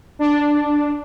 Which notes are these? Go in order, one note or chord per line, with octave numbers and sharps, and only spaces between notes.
D4